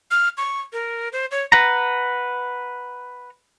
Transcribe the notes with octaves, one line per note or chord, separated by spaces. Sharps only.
F6
C#6
A#4
C5
C#5
B4 F#5 A#5